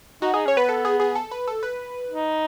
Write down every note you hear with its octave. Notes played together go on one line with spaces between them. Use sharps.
D#4 F#4
D#4 G#4
C#4 C#5
B3 B4
A4
G#4
G#4
A4
B4
A4
B4
D#4